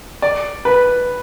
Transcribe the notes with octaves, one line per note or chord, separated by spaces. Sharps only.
D5
B4